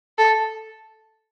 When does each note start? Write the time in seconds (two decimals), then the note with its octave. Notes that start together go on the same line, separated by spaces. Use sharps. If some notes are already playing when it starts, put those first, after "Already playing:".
0.18 A4